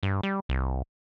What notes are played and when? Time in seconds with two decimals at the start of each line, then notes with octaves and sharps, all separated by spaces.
0.03 G2
0.23 G3
0.49 C2